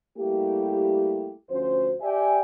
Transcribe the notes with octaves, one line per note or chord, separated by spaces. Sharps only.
G3 A3 A#3 E4 G4
D2 F3 C#4 F#4 C5
G4 D5 E5 G5 G#5